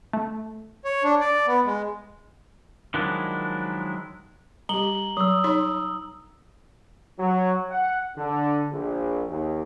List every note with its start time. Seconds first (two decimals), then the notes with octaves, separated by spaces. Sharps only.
0.13 A3
0.85 C#5
1.04 D4
1.21 D5
1.47 B3
1.66 G#3
2.94 D#3 F3 F#3 G#3 D4 E4
4.69 G3 G4 A#5 F#7 G7
5.17 F#3 D#6 E6
5.44 D#4 C#5 C6
7.19 F#3
7.71 F#5
8.17 D3
8.72 A#1
9.30 D#2